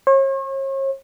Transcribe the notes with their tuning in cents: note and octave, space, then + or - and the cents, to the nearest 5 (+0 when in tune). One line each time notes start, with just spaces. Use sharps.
C#5 -40